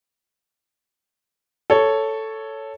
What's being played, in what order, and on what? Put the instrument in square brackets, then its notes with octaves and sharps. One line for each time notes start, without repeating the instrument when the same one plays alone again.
[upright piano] A4 C#5